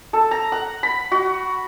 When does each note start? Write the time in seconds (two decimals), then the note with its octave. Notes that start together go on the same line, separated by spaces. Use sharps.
0.13 A4
0.31 A#5
0.52 F#5
0.83 B5
1.12 F#4